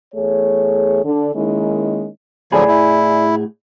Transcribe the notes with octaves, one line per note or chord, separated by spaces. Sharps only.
E2 A3 G#4 C#5
D3
D#3 G#3 A#3 C#4 D#4 E4
A2 D3 F3 F#3 G#4 D5 G#5 B5
E4